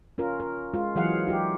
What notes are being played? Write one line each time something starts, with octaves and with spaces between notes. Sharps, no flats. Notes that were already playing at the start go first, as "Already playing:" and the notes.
C#4 F4 A#4
A#4
G#3 F4
E3 F#3 G#4 F5 F#5
D#4 F4 G4